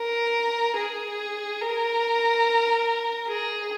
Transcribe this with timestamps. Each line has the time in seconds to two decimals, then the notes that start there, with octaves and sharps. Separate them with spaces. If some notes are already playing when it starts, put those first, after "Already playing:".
Already playing: A#4
0.77 G#4
1.61 A#4
3.29 G#4